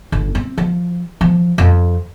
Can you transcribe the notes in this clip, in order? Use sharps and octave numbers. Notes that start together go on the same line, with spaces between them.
G1
C4
F3
F3
F2